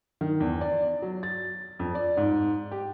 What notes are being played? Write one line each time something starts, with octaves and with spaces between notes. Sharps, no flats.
D#3
E2
D5
F#3
A6
F2
D5
G#2
G4